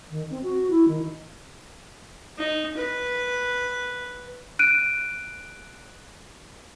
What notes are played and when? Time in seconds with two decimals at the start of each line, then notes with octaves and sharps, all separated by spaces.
0.11 D#3
0.31 C4
0.43 F#4
0.70 E4
0.88 D#3
2.37 D#4
2.77 B4
4.59 F#6 D7 D#7